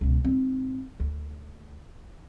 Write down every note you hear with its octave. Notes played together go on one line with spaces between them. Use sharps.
C#2 B2
G#2 C4
D2